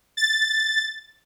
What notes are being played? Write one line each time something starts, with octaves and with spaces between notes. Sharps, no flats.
A6